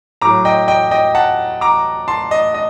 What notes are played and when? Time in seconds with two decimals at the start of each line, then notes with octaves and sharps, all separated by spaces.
0.21 A2 F#3 A#5 D6
0.45 D#5 G5
0.68 D#5 G5
0.91 D#5 G5
1.15 F#5 A5
1.61 A#5 D6
2.08 A5 C6
2.31 D#5
2.54 D#5